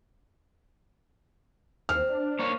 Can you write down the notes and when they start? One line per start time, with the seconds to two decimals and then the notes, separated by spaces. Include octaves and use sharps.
1.89 D#2 C4 F6
2.09 D4
2.39 A#3 C#5